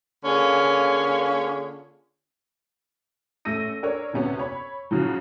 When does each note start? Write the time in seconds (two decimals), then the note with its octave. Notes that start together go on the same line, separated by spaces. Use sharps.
0.24 D3 A#3 C#4 F4 G#4
3.45 A1 A3 E6 A#6 D#7
3.83 D4 A#4 C#5
4.13 D2 C3 B3 C#4
4.39 C#5 B5
4.91 C#3 F3 F#3